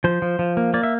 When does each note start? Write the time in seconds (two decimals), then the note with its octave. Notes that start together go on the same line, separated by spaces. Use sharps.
0.04 F3 C5
0.22 F3
0.39 F3
0.57 A#3
0.74 A#3 D5
0.83 E5